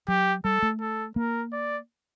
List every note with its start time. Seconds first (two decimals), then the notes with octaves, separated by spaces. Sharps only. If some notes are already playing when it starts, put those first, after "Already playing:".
0.08 F#3 G4
0.44 G3 A4
0.62 A3
0.81 A4
1.16 A#3 A#4
1.53 D5